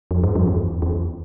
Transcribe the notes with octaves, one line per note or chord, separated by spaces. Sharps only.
F2
G2
F2
E2
E2